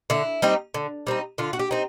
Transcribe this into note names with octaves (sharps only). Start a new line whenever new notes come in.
D3 E4
G3 C4 D#4
D3
G3 C4 D#4
D3 F4
F#4
G4
C4 D#4